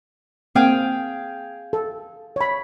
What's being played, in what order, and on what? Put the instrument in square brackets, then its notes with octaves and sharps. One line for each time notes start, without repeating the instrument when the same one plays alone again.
[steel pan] A#3 C4 [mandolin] G#4 F5 G5
[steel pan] A4
C#5 B5